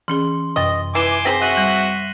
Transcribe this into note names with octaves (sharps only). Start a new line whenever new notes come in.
E3 C#4 G#4 C6
F#2 C3 D#5
E3 G#5 D6 C7 E7 G7
C4 G#4 C5 A#6 B6
F#4 E5 F#6 D#7 F#7
G3